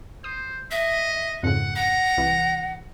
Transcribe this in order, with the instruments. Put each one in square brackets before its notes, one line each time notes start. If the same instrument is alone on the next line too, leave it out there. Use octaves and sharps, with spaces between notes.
[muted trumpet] C5 [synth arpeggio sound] D#6
[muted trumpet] D#5 [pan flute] E5
[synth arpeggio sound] F2 G#2 C#3 [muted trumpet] F#5
[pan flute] F#5 [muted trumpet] A#5
[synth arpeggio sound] C2 E3